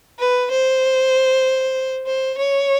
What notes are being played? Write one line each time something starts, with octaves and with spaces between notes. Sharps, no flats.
B4
C5
C5
C#5